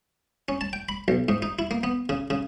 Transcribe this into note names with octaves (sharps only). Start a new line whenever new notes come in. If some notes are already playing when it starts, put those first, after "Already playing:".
C#4
A5
G5
B5
B1
G#2
D#4
E4
A#3
B3
C#3
C#3